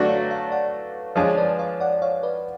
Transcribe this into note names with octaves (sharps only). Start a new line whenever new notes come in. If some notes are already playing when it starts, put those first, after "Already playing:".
Already playing: F#3 A3 D4 F#4 B4 D5
C#5 F5
C#5 F5
D5 F#5
F3 G#3 D4 F4 G#4 C#5 F5
B4 D5
C#5 F5
D5 F#5
C#5 F5
B4 D5